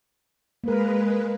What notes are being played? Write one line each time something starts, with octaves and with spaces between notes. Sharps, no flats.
G#3 A#3 A#4 B4